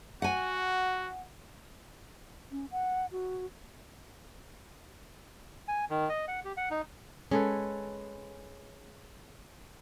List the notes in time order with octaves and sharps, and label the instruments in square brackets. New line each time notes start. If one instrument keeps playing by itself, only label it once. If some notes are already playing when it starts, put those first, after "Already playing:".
[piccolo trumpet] F#4 [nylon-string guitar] F#5 G#5
[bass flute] C#4
F#5
F#4
[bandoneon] G#5
D#3
D#5
F#5
G4
F#5
D#4
[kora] G#3 A4 B4 [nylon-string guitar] C#4